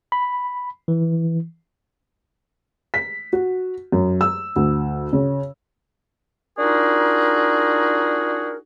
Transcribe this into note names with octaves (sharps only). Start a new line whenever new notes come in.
B5
E3
B6
F#4
F#2
E6
D2
C#3
D4 D#4 F4 F#4 G#4 A#4